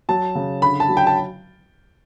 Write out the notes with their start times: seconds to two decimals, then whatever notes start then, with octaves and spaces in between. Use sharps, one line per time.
0.09 F#3 A5
0.35 C#3
0.61 D3 B5
0.80 A5
0.89 F#3
0.97 G5
1.07 A5